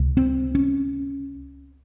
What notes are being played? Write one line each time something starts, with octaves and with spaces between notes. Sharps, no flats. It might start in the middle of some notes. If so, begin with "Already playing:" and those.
Already playing: C#2 C3
C4
C#4